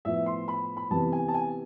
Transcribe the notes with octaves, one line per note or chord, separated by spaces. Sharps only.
A2 F3 B3 E5
C6
B5
B5
C3 E3 B3 A5
G#5
A5
G#5